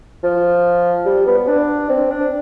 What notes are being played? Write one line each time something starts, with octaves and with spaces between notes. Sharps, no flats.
F3
G3
B3
D4
C4
D4